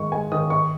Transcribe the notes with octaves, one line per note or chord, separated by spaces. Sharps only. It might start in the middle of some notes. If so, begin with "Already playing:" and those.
Already playing: D#3 G#3 C#6
G#3 G#5
D#3 D#6
D#3 C#6